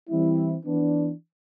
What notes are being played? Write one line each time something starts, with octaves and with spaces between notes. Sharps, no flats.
E3 G3 C4 E4
E3 B3 D4